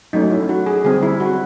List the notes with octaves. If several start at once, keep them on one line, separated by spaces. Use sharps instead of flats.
F#3 A3 C#4 D#4
E4
F#4
G#4
D3 G3 C4 G#4
E4
F#4